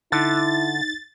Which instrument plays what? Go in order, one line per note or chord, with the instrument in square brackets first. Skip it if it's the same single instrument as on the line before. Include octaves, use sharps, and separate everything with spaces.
[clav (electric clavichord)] D3 [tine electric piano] D#4 [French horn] E4 [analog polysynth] A6